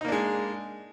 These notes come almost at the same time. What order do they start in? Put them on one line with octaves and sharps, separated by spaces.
D#4 A#3 D4 G#3